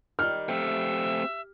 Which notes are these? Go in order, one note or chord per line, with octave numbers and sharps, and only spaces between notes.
D#3 G3 F6
A3 C4 G4 E5